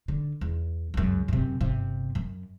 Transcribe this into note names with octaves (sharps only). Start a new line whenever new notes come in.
D3
E2
C#2 F#2
F#2 C3
G1 C3
F#2